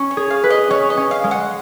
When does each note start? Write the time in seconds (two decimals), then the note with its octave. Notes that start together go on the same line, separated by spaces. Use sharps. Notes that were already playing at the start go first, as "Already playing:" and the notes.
Already playing: C#4
0.11 C#5
0.17 G#4
0.30 F5
0.44 B4
0.50 D#5
0.70 C#4 C#5
0.90 D#5
0.97 C#4
1.11 F5
1.24 G#3
1.31 F#5